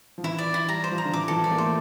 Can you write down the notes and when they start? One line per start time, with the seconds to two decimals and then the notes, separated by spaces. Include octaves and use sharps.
0.18 F3
0.24 E3 E4
0.38 D5
0.54 E4
0.68 G3 A#5
0.84 C5
0.91 F3
0.98 A#5
1.05 D3
1.13 E3 D6
1.28 E3 A4
1.36 F3
1.44 D5
1.51 A#3
1.58 A3 C5